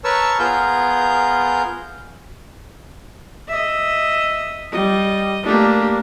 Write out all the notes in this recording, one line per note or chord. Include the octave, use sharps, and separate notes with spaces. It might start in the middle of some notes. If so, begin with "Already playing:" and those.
A#4 B4 C#5 A5 C#6 E6
B3 F4 G#4 A#4 G6
D#5 E5
G3 D#5
A3 A#3 D4 G4